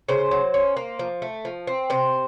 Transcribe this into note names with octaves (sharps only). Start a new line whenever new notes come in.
C#3 C5
F#3
C#4
A#3
F3
A3
F3
C4
C3 C5